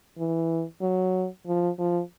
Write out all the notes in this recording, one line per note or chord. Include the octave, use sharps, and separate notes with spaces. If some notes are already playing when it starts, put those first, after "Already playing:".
E3
F#3
F3
F3